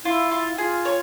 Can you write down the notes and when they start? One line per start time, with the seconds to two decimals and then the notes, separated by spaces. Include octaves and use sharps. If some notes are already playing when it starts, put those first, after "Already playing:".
0.05 E4 F4
0.31 F4
0.58 F4 G#4
0.85 C#5